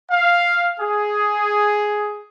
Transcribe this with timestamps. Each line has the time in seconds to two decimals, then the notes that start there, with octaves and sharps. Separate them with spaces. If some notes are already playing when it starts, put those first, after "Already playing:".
0.11 F5
0.80 G#4